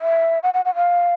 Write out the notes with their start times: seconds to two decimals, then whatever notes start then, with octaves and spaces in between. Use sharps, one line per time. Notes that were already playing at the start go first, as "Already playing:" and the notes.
0.01 E5
0.43 F#5
0.54 F#5
0.65 F#5
0.75 F5